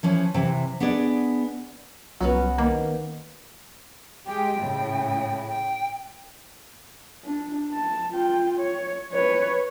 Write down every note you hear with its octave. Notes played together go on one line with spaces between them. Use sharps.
E3 F3 C#4
C3 E3
B3 D4 G#4 D5
C2 F#3 B3 C#4 F#4
D#3 A#3
G#3 G4 G5
A2 C#3
G5
D4
A5
F4 G5
C#5
B4 C#5